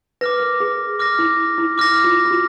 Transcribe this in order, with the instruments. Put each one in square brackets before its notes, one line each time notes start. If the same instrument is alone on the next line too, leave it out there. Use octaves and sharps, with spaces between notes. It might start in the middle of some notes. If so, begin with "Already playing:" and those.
[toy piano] B4 [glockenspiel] D6 F6 A#6
[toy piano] A#4
G#4
[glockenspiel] D6 F6 A#6
[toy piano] E4
E4
[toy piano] E4 [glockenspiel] D6 F6 A#6
[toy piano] F4
F4
F#4